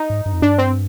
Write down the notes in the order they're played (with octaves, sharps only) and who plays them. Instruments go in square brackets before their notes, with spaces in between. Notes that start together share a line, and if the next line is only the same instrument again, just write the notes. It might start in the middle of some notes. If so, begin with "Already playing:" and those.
Already playing: [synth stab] D#4
[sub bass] G#2
G2
F2
[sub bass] G2 [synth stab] D4
[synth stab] C4